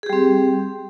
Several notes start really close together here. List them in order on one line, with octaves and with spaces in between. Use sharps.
G#4 G4 G3 C4